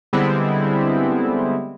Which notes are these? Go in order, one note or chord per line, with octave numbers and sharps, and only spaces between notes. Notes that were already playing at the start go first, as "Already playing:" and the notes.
D3 G3 G#3 B3 C4 E4